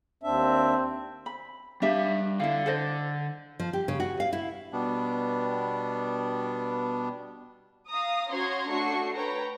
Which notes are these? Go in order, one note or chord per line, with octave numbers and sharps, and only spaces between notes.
D#2 C4 D4 E5
B5
G3 D4 G4 E5 F5
D3 E4 D5 F5
A4 C5 D#5
F3
G4
C#3
F#4
F5
E4
B2 G3 B3 D4
F5 A#5 D#6
C#4 F#4 C#5 A#5 C6 G#6
A3 D4 F#4 C#6 C7
B4 C#5 G5 A#5